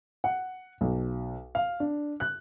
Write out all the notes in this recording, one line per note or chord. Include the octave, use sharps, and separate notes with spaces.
F#5
B1
F5
D4
F#6